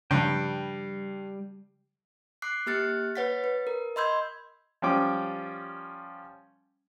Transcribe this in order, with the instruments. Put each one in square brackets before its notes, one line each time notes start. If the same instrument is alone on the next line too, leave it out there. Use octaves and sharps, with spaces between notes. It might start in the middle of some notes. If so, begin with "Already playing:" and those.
[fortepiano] G2 [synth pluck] C#3 F3 [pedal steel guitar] G3 G5
[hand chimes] D6 F#6 C7
A#3 G4 F6 F#6 A6 C#7
B4 C#5 F#5 A6 B6
B4
A#4
D#5 B5 C6 E6 G6 G#6
[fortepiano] F3 G3 C#4 G5 D6